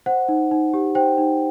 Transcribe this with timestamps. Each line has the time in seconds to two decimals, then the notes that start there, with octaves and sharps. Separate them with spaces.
0.06 C5 F#5
0.28 D#4
0.51 D#4
0.74 G4
0.95 C5 G5
1.18 D#4